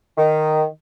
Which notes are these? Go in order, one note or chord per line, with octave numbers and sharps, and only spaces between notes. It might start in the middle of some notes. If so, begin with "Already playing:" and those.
D#3